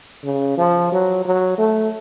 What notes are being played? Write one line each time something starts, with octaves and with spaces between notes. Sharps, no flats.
C#3
F3
F#3
F#3
A3